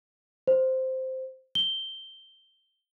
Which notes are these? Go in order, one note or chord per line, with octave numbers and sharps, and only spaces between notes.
C5
G7